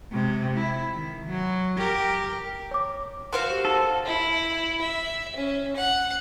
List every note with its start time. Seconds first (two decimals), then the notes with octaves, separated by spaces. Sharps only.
0.12 C3 G#3
0.57 E4
0.94 D#3
1.26 F#3
1.77 G4 A#4
2.71 C#5 D6
3.33 F#4 A#4 C5 F5 C6
3.50 G4
3.65 D#4 A4
4.06 E4
4.81 E5
5.36 C#4
5.76 F#5